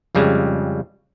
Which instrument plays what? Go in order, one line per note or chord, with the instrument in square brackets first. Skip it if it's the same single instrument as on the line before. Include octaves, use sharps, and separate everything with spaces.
[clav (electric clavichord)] F2 C#3 G3 G#3